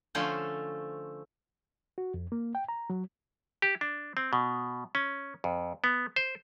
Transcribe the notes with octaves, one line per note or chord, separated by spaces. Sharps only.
D3 F3 A3 C#4 A4 C5
F#4
F2
A#3
G5
A#5
F#3
G4
D4
C4
B2
C#4
F2
B3
C5